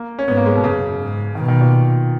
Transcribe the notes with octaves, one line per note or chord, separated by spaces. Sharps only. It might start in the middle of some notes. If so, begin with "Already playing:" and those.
Already playing: A#3
C#4
G#2 B3
A#3
G#3
B2
F#2 C#3
G#2
B2 D#3
D#3
A#2